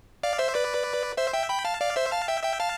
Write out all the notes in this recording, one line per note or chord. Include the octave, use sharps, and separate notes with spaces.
D5 F5
C5 E5
B4 D5
C5 E5
E5 G5
G5 B5
F5 A5
D5 F5
C5 E5
F5 A5
E5 G5
E5 G5
F5 A5